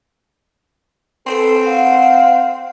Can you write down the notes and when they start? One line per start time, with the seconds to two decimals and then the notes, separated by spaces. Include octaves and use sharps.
1.27 C4 A4 B4
1.66 F5 F#5